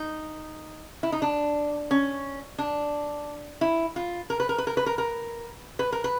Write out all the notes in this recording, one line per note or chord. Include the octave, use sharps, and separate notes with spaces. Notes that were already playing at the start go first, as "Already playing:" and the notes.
Already playing: D#4
E4
D#4
D4
C#4
D4
E4
F4
A#4
B4
A#4
B4
A#4
B4
A#4
A#4
B4
A#4
B4